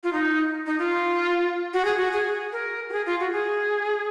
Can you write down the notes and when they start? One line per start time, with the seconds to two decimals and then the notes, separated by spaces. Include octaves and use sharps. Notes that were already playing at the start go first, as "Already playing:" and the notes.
0.03 F4
0.12 D#4
0.66 D#4
0.78 F4
1.73 F#4
1.84 G#4
1.97 F#4
2.12 G#4
2.52 A#4
2.89 F#4
2.92 G#4
3.06 F4
3.19 F#4
3.32 G#4